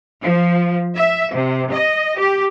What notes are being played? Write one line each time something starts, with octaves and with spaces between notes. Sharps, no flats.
F3
E5
C3
D#5
G4